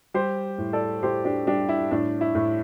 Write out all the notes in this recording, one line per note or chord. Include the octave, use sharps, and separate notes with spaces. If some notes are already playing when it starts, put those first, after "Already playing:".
G3 G4 C5
A2
A4 D5
A2 G4 C5
D4 G4
G3 D4 G4
E4
A2 D4
E4
A2